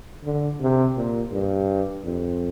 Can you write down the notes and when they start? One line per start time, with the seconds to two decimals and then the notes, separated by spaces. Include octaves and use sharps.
0.24 D3
0.61 C3
0.96 A#2
1.32 G2
2.04 F2